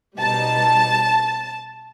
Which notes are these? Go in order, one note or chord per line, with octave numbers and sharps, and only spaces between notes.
B2 G3 D#4 A5